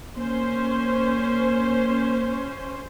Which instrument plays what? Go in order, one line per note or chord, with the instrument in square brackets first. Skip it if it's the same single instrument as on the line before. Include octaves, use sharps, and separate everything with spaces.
[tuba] A#3 [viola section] C#4 C5